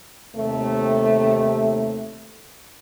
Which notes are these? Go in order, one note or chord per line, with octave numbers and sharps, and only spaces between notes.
D#2 C3 A3